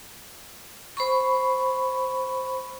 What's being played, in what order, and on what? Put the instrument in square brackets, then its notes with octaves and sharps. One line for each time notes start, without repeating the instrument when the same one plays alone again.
[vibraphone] C5 B5 C#6